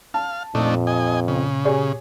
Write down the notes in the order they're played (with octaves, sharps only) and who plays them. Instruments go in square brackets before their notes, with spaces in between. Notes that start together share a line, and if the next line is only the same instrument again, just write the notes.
[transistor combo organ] F5 [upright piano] A5
[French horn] F2 [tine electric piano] A#2 [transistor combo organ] A3 D4 D#4
[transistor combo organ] D#5 G#5
C#3
[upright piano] G4 G#4 C#5